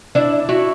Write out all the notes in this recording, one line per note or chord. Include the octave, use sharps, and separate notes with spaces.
D4 E4
E4 F#4